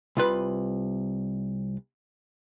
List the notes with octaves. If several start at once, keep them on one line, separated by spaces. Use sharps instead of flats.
C2 F4 B4 B5